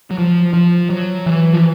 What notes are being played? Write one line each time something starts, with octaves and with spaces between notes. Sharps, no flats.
F#3
F3
F3
F#3
E3
F3